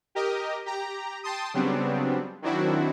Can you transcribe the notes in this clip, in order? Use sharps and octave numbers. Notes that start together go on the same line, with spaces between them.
G4 A#4 D#5
G4 A#5
G5 A5 C6 D#6
C#3 F#3 G3 B3 C4 D4
D#3 F#3 C4 D4 E4 F#4